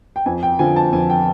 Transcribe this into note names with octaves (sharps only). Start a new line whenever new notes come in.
G5
F2 G#5
G5
D3 F3 G#5
A5
F2 G#5
G5